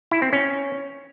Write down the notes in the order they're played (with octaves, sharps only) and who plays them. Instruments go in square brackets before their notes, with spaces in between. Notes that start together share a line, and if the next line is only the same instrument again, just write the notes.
[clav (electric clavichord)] E4
C4
C#4